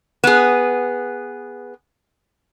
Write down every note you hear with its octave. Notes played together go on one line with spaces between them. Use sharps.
B3 G#4